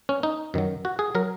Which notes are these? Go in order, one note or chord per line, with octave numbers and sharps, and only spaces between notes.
C#4
D#4
F#2 D#3 F#3
F#4
G#4
F#3 A#4